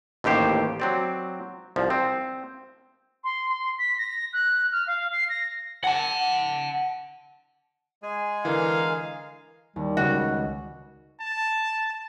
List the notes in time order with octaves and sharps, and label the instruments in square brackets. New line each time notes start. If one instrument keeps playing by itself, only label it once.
[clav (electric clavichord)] A1 D#2 A2 G4 C5
F#3 C4 D5
C2 F3
C4
[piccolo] C6
C6
B6
A#6
F#6
F6
F5
C7
A#6
[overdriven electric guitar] F#5 A5
[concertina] G#3 G#4 G#5
[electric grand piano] D3 E3 [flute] A#4 [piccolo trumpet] F5
[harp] D#2 [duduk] G3
[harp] C#2 [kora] F#4
[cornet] A5